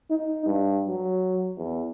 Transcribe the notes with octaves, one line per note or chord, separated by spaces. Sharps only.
D#4
G2
F#3
E2